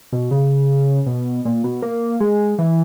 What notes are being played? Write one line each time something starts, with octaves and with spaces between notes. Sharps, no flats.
B2
C#3
B2
A#2
B2
A#3
G#3
E3